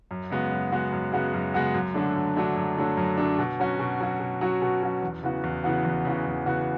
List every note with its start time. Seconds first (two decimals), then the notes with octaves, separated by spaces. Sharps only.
0.11 F#2
0.30 C#3 G#3 B3 F#4
0.52 F#2
0.72 C#3 G#3 B3 F#4
0.92 F#2
1.12 C#3 G#3 B3 F#4
1.34 F#2
1.54 C#3 G#3 B3 F#4
1.74 F#2
1.94 D3 F#3 A3 D4
2.16 F#2
2.37 D3 F#3 A3 D4
2.56 F#2
2.78 D3 F#3 A3 D4
2.97 F#2
3.17 D3 F#3 A3 D4
3.39 B2
3.60 F#3 C#4 F#4
3.79 B2
4.00 F#3 C#4 F#4
4.20 B2
4.41 F#3 C#4 F#4
4.62 B2
4.83 F#3 C#4 F#4
5.02 E2
5.23 C#3 E3 B3 F#4
5.44 E2
5.64 C#3 E3 B3 F#4
5.85 E2
6.05 C#3 E3 B3 F#4
6.26 E2
6.46 C#3 E3 B3 F#4